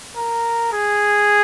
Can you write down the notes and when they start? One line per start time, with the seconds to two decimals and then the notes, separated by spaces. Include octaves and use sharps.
0.17 A#4
0.73 G#4